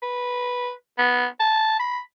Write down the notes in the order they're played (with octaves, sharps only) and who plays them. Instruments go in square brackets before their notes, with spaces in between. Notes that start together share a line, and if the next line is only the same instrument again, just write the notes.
[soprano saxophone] B4
B3
A5
B5